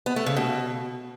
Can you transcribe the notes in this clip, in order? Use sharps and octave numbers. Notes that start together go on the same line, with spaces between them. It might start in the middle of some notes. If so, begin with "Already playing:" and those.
B3
A3
C#3
B2